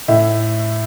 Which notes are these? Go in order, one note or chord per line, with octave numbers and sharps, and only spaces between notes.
A2 E5